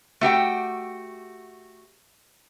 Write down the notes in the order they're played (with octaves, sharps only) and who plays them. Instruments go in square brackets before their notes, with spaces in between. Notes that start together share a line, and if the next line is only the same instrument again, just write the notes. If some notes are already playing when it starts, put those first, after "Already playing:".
[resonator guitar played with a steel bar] A3 F#4 G4 G5